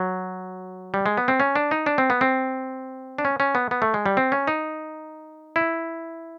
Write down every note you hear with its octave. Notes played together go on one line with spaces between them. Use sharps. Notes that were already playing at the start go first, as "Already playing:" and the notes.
Already playing: F#3
G3
G#3
B3
C4
C#4
D4
D#4
D4
C4
B3
C4
D4
C#4
C#4
B3
B3
A3
G#3
G3
C4
C#4
D#4
E4